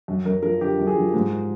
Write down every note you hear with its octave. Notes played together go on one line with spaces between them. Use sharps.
F#2
F#2 A#4
F3 A#4
D3 G4
F#2
G#4
F3
G#2